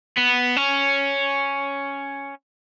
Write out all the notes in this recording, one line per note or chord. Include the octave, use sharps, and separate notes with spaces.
B3
C#4